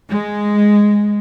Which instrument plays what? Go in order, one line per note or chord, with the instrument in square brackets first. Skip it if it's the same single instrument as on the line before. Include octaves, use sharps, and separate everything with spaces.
[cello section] G#3